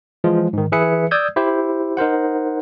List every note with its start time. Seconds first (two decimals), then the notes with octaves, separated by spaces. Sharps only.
0.24 E3 F3 G#3 F4
0.53 G#2 D#3
0.72 E3 G#4 B4 E5 C#7
1.11 D5 D#6 E6 G6 G#6
1.36 E4 G4 C5
1.97 D#4 A#4 C5 F#5